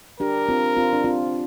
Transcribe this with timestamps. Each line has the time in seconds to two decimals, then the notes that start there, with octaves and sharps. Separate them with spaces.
0.20 D4 G4 A#4
0.49 C4 F4
0.77 C4 F4
0.93 D4
1.04 C4 F4